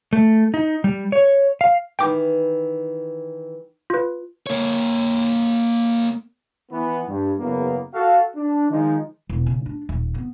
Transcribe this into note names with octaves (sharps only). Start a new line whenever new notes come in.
A3
D#4
G3
C#5
F5
D#3 E3 G5 D6
F4 B4
A#3 C#5
E3 B3
G2
F#1 E2 A#3 B3
F#4 A4 F5
D4
D#3 F3 G#3 D#4
E1
C#3
D4
D#1
B3 C4